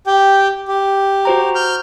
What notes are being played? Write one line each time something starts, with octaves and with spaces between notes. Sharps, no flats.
G4 G5
G4
F#4 C5 A#5
F6 G6